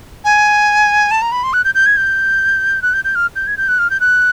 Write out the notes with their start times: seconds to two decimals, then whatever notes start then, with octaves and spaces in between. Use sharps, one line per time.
0.25 G#5
1.11 A5
1.22 A#5
1.32 B5
1.43 C6
1.53 F#6
1.64 G6
1.75 G6
1.86 G#6
1.97 G6
2.82 F#6
2.93 G6
3.04 G6
3.15 F6
3.36 G6
3.47 G#6
3.57 G6
3.68 F#6
3.79 F6
3.90 G6
4.00 F#6